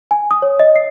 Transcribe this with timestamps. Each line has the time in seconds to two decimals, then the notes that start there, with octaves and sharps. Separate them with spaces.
0.11 G#5
0.31 D#6
0.42 C#5
0.59 D#5
0.76 C7